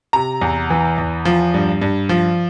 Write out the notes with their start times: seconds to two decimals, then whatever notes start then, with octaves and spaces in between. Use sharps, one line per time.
0.13 C3 A#5
0.41 E2
0.70 E3
0.98 E2
1.25 F3
1.54 G2
1.82 G2
2.09 F3